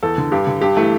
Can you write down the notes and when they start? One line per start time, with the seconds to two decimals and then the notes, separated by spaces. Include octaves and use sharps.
0.03 E2 A4
0.18 D3
0.32 G2 G4
0.47 D3
0.61 G2 G4
0.77 E3 A3